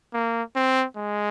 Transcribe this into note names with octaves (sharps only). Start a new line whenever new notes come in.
A#3
C4
G#3